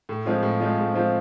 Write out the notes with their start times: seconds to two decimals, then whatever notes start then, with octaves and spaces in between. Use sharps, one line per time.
0.09 A2
0.25 F3 G#3 C4 F4
0.43 A2
0.60 F3 G#3 C4 F4
0.78 A2
0.94 F3 G#3 C4 F4